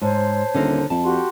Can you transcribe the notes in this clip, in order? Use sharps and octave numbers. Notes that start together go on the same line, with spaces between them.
G#2 C5 C#5 A5
D#1 D3 A4 A#4
F2 A5
F#4 G4 C6